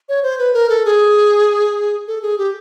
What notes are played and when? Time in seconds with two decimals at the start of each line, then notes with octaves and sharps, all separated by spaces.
0.09 C#5
0.23 C5
0.39 B4
0.54 A#4
0.69 A4
0.85 G#4
2.08 A4
2.22 G#4
2.38 G4